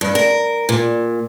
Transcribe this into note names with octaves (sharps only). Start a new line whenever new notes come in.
G2
A#4
A#2